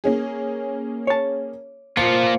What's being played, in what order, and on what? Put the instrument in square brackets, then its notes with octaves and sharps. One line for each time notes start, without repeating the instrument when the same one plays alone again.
[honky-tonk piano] A#3 C#4 G#4
[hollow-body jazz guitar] C#5 A5
[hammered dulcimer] F3 [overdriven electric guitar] A#3 F4 [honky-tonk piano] C#7